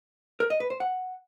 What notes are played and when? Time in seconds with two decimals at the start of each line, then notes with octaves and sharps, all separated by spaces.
0.40 A#4
0.50 D#5
0.60 B4
0.70 C5
0.80 F#5